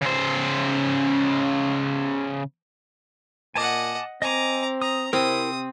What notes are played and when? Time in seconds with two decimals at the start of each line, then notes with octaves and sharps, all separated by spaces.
0.01 C#3 C5
3.55 A#2 D#5 F#5 G#5 A5 D6
4.22 C4 D#5 G#5 A#5 D6
4.82 A#5 D#6
5.13 C3 C4 E4 A#4 D#6